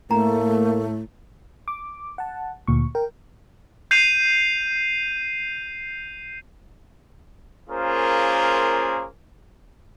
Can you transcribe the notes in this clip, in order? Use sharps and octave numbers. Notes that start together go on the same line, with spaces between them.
A2 A3 A#3 A#5
D6
F#5 A5
D2 A#2 C#6
A#4 G5
G6 C7 D#7 F7
A#3 C#4 F4 G#4 A#4 C5